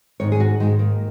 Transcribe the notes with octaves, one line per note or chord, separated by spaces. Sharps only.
G#2 D#3 C#5
G#4
F#4
G#2 D#3 G#3
A#3